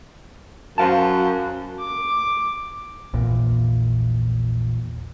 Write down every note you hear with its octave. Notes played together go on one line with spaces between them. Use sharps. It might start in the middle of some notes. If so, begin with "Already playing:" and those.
F#2 C5 F5 A5
D6
A#1 E2 A#2